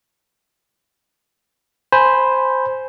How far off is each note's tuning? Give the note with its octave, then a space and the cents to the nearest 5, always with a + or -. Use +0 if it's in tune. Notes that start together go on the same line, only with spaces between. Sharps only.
C5 +0 G#5 +0 B5 -5